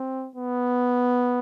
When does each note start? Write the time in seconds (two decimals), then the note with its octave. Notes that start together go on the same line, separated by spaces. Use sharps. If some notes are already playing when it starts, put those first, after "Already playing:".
Already playing: C4
0.35 B3